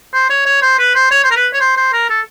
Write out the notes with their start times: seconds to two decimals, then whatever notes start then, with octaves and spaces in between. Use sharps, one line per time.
0.14 C5
0.30 C#5
0.46 C#5
0.62 C5
0.79 B4
0.95 C5
1.11 C#5
1.24 C5
1.31 A#4
1.36 B4
1.54 C#5
1.61 C5
1.77 C5
1.93 A#4
2.10 A4